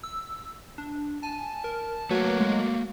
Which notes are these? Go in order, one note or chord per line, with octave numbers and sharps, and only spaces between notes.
E6
D4
G#5 A5
A#4
F#3 A3 A#3 B4
G#3